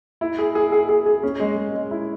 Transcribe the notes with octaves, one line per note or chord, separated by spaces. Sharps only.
E4
G#4
G#4
G#4
G#4
G#4
C#4
G#3
G#3
G#3
E4